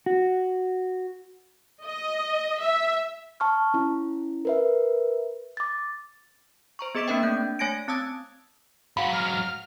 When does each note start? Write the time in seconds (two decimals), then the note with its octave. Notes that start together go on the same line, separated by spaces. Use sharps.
0.06 F#4
1.85 D#5
2.60 E5
3.40 A5 C#6 F6
3.74 C#4 E4
4.45 A#4 B4 E5
5.57 D6 A6
6.79 C5 A#5 C#6
6.95 B3 G#4 D#5 D6 B6 D7
7.08 A#3 C4 D4 A#4 E5 G5
7.23 A3 D4 E5 G6
7.59 A3 C#5 G#5 G#6 A#6 D7
7.88 C4 A5 D#6 E6 G#6
8.97 G#2 F#3 F#4 F5 F#5 B5
9.13 F6